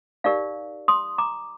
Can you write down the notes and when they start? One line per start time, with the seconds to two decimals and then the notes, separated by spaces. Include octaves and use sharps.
0.24 D#4 G4 A#4 D5 F5
0.88 C6 D#6
1.18 A#5 D6